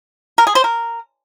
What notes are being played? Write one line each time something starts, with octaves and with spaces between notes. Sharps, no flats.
A#4
G#4
C5
A#4